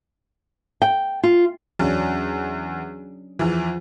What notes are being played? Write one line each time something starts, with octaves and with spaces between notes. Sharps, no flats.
G5
F4
E2 F#3 C#4 D4
E2 E3 F3